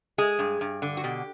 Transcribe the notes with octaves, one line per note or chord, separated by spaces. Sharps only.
G#3 G#4
G2
G2
D3
F#4
B2 G4